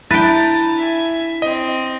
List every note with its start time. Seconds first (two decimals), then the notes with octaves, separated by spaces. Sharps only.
0.11 D4 E4 B4 G5 A5 A#5 A6
0.77 E5 G#5
1.42 C4 D#5